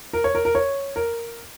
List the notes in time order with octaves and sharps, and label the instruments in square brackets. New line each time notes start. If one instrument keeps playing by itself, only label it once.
[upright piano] A#4
C#5
A#4
A#4
C#5
A#4